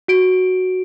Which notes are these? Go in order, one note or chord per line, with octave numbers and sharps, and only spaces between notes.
F#4 D7